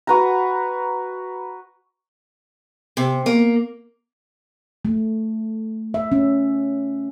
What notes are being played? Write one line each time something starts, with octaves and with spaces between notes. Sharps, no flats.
F#4 B4 A#5
C3
A#3
A3
E5
C#4